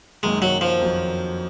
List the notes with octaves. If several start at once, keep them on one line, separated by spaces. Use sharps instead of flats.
F#2 D#3 G#3 A#3 D#4
F#3
F3
F2 D#3 F#3